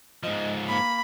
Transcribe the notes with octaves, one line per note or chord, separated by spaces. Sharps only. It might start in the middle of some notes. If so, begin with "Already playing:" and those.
G#2 F3 D#5
A#3 B5